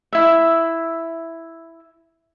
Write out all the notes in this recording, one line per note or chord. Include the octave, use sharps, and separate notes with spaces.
E4 E5